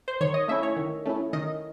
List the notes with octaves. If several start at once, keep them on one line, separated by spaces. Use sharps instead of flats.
C5
D#3 C#5
D#5
A3 C#4 E4 E5
C#5
D#3
A3 C#4 E4
D#3 D#5